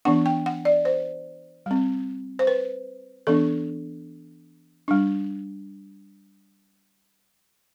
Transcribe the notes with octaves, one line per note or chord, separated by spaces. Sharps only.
E3 B3 D4 F#5
G5
F#5
D5
C5
G3 C4
C5
B4
E3 B3 D4 A4
G3 D4